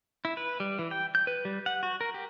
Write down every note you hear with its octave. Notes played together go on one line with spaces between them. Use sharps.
E4
B4
G3
E3
G5
G6
B4
G3
F#5
F#4
A#4
G4